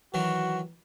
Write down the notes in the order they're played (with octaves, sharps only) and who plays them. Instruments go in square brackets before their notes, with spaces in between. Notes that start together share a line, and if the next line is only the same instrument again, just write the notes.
[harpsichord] D#3 E3 F#3 [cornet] F#4